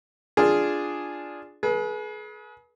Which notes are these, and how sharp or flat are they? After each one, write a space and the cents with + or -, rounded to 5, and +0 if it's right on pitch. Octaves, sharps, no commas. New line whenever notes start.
D4 +0 F4 +0 G#4 +0
G#4 +35 B4 -35